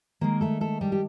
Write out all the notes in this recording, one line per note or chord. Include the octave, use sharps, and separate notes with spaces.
D#3 G#3 A#3 A#4
A3 A4
A3 A4
G3 G4
G4